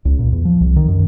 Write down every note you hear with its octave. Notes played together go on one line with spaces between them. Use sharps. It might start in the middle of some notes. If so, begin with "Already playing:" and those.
C#2
A#2
E2
F3
C2
D#3
F#2